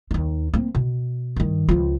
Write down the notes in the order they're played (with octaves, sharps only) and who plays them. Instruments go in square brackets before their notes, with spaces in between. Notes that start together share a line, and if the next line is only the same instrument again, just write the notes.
[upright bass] D#2 D#4
A#3 C4
B2
G2 D#3
C#2 F3